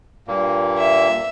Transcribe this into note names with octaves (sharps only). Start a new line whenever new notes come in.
G2 A#2 A#3
E5